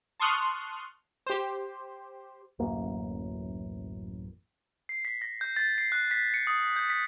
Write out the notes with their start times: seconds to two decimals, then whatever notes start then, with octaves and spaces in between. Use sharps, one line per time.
0.20 A5 C6 C#6 D#6 F6 F#6
1.26 G4 C5
2.59 D1 A1 F#2 A#3
4.89 C7
5.05 B6
5.22 A#6
5.41 G6
5.56 A6
5.78 C7
5.92 F#6
6.11 B6
6.34 C#7
6.47 D#6
6.76 G6
6.90 B6